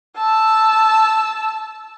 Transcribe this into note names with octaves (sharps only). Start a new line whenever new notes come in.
A5 E6